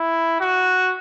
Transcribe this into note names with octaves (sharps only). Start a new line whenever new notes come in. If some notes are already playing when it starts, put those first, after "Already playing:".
Already playing: E4
F#4